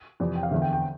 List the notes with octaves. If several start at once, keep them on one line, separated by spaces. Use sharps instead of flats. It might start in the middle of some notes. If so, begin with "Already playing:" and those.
F2 C3 E3 D5
G5
F5
E2 D3 E5
G5
G5